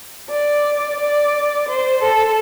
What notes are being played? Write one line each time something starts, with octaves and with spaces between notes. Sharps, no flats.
D5
D5
C5
A4